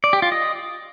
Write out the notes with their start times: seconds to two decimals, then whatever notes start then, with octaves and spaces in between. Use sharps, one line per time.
0.04 D5
0.13 G4
0.22 F4
0.32 D#5